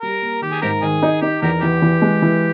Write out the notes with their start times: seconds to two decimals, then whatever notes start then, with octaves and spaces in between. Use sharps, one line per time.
0.02 G3 A#4
0.21 A#3
0.42 D#3 G4
0.52 G#4
0.62 G#2 G4 A#4
0.82 D#3 G#4
1.03 D#4
1.22 D#4 G4
1.42 E2 G4 A#4
1.62 E3 G4
1.82 E3
2.02 G#3
2.22 E3